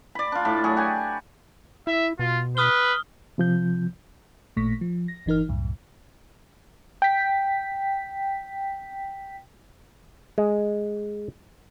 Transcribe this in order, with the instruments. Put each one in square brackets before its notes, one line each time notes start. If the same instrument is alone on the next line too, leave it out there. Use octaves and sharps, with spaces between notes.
[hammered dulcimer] D5 B5
D4 F4
A2 A5 B5
F#3 G#4
F#4 G4 G#5
[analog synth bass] E4 [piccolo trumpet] E5
[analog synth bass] B2 [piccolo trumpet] F4
[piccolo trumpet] B4 [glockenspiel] D#6 F6 G7
[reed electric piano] C3 F3 G6
[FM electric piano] A1 A#2 A3 C#6 A#6 B6
F3
A#6
G1 E3 D#4 A#4 F6
C2 F#2 A2
G5 B6
[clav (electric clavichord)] G#3